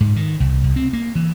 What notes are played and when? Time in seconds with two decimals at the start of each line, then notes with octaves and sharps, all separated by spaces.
0.01 G#2
0.16 D#3
0.40 C2
0.64 C2
0.76 C4
0.93 A#3
1.15 E3